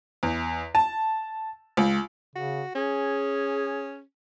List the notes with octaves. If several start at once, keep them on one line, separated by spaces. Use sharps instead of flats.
E2
A5
C#2
C#3 F#4
C#4 G#4